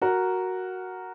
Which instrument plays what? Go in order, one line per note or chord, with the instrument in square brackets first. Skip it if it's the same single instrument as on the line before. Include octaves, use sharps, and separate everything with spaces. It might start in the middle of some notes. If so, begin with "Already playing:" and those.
[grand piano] F#4 A#4